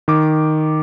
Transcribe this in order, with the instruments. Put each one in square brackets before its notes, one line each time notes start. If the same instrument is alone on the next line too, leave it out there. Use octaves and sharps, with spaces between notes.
[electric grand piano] D#3 D6